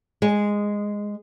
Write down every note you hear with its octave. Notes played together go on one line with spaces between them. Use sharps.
G#3